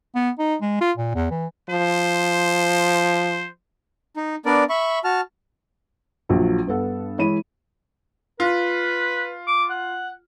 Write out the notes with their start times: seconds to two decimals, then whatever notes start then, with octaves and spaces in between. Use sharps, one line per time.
0.15 B3
0.39 D#4
0.62 G#3
0.81 F4
0.97 A#2
1.15 E2
1.31 E3
1.70 F3 C5
4.16 D#4
4.46 B3 D4 A#4 D5
4.69 E5 B5 C#6
5.04 F#4 A5 F6
6.29 A#1 F3 F#3
6.67 G2 B3 A4 F#5
7.18 E3 G#3 C#5 B5 D#7
8.40 F4 B4
9.47 D6
9.70 F#5